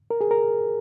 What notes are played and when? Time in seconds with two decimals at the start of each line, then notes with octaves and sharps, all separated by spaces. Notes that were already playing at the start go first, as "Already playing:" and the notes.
0.11 A#4
0.21 G#4
0.31 A#4